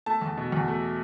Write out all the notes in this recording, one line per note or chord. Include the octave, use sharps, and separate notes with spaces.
A3 A5
E2
B2
E2
A3